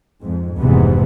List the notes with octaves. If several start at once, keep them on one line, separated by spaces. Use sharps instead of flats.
F2 G#2
F1 D2 G#2 C3 E3 B3